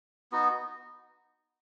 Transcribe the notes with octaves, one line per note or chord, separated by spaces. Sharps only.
B3 D#4 F#4